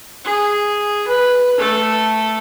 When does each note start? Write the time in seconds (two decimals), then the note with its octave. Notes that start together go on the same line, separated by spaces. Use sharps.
0.24 G#4
1.07 B4
1.58 A3 A4